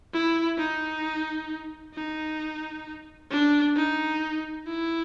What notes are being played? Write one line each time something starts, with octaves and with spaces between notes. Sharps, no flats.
E4
D#4
D#4
D4
D#4
E4